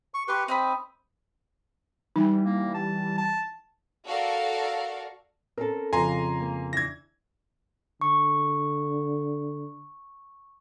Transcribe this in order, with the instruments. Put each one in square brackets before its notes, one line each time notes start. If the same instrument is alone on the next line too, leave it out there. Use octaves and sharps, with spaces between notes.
[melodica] C#6
[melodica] G4 B4 [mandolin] C6 C#6
[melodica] C4 [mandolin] D#4 D#5 B5
[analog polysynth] E3 G3 [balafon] D#4
[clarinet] A#3
A5
A5
[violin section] F#4 A4 A#4 D5 F5
[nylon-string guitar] C4 C#4 A4 [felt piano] A#4
[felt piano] F2 C#3 [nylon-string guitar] B4 F5 [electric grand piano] G#5 A#5 C6
[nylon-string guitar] A#3
[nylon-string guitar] E3 D4 [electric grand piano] G#6 A#6
[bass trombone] D3 [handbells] C#6